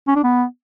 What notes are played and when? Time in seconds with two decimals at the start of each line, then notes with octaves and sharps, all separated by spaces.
0.08 C#4
0.16 D4
0.24 B3